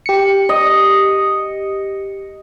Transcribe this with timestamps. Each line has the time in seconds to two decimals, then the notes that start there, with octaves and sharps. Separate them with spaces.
0.06 G4 C#7
0.49 D#5